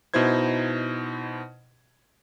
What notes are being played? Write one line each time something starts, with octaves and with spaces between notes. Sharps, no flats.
B2 D#4 E4 C5 G#6